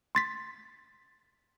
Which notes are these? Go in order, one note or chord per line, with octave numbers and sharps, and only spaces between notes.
C6 A6 B6